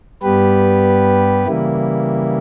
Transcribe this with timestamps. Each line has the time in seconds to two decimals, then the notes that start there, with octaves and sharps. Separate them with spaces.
0.22 G2 G3 B3 G4 B4
1.47 C#3 E3 G3 A#3 E4